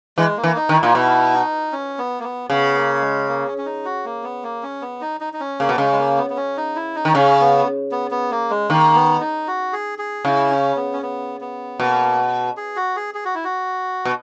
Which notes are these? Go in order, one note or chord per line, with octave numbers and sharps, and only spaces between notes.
E3 G#3
A#3
E3
D#4
D#3
E4
A#2
B2 E4
D#4
C#4
B3
A#3
B3
C#3 B3
A#3
G#3
A#3
C#4
C#4
D#4
F#4
A#3
B3
A#3
C#4
B3
D#4
D#4
D#4
C#4
C#3 A#3
B2
C#3 G#3
G#3
A#3
B3
B3
C#4
D#4
E4
D#4
D#3
C#3 C#4
B3
B3
B3
A#3
G#3
D#3 A#3
B3
D#4
F#4
G#4
G#4
C#3 E4
C#4
B3
C#4
B3
B3
B2 A#3
G#4
F#4
G#4
G#4
F#4
E4
F#4
B2